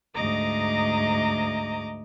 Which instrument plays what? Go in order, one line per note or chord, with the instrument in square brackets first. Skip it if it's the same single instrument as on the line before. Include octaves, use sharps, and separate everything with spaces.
[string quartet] D2 G#2 D#5 A#5 D6 D#6